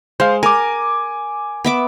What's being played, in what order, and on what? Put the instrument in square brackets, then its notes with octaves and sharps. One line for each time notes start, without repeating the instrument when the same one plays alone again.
[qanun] G#3 [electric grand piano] C5 F5
[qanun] A#4 [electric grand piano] G#5 D6
[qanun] B3 E5 D6